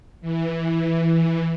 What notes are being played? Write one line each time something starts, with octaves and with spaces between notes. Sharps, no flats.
E3